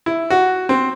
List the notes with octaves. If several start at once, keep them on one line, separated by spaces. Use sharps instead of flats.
E4
F#4
C4